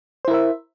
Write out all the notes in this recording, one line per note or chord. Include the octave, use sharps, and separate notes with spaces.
E4 A#4 C5 E5